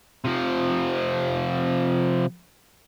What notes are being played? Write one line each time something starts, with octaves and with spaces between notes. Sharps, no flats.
C3 F3